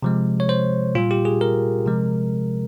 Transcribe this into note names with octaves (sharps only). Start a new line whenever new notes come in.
C3 F3 G#3
C#5
C5
A#2 G3 F4
G4
G#4
A#4
C3 F3 G#3